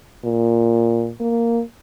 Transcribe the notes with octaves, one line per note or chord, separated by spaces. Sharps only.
A#2
A#3